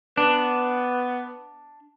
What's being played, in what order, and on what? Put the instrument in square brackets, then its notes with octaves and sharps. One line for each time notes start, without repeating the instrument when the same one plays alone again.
[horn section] B3 [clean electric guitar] D4